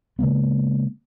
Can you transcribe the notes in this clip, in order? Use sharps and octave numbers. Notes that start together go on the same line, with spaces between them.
C#3 G#3 A#3 B3